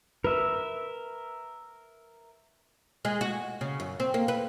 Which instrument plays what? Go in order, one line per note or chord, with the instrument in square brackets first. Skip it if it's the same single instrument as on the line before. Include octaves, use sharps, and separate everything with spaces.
[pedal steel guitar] A#4 E5 [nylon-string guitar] B4
[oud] G#3
F#4
C#3
F#2
C4
A#3
B4